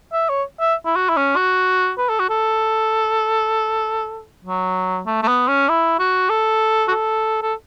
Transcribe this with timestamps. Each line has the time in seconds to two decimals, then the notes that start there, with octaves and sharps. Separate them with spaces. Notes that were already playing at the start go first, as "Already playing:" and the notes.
0.13 E5
0.29 C#5
0.60 E5
0.85 E4
0.96 F#4
1.09 E4
1.16 C#4
1.36 F#4
1.98 B4
2.09 A4
2.19 F#4
2.30 A4
4.45 F#3
5.06 A3
5.23 A3
5.28 B3
5.48 C#4
5.69 E4
5.99 F#4
6.29 A4
6.88 F#4
6.91 A4
7.42 A4